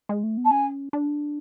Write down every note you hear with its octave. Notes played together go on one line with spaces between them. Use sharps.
G#3
A3
B3
A5
C#4 G#5
D4